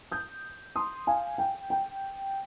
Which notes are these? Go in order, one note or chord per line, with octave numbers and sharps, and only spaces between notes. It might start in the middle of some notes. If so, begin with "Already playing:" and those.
D#6 G6
C6 D#6
F5 G#5
G5
G5